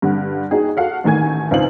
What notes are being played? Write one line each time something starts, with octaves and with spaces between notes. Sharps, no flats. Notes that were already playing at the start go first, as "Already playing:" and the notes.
G2 D3
D#4 F#4 G#4 G5
F#4 A4 F5 F#5
A1 D#3 A3 G#5 G#6
C#2 C4 D#4 F5 F#7